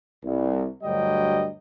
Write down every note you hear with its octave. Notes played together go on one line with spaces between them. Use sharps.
C2
D2 G2 F#3 G3 D#5 G5